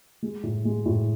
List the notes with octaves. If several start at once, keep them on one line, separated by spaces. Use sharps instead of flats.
G#3
A2
G#3
A2